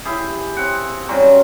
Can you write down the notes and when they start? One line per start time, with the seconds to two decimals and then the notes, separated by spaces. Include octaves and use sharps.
0.05 E4 G4 G#4
0.56 C4 F#5
1.08 C#3 F#3 G3 C4